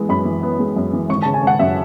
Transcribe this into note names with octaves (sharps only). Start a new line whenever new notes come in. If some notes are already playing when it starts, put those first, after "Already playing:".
Already playing: E3 G#3 B3
F#2 B5
E3
B3
G#3
F#2
E3
G#1 C#6
C#3 A5
G#5
G#1 F#5
F#2 E5